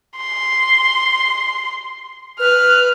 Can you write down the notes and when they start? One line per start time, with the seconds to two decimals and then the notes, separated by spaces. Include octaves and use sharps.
0.17 C6
2.39 B4 F6